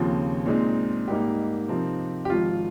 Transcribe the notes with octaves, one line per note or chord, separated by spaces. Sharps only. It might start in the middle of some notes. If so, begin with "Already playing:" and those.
Already playing: D#2 C#3 F3 C4 F4
A#2 G#3 C4 D#4
G#2 G3 A#3 D#4 G4
C3 F3 C4 D#4 A#4
G4
G#1 G#2 F3 F4